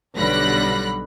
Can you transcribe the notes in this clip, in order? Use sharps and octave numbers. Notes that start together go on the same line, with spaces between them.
B1 D3 G3 B5 F#6 A#6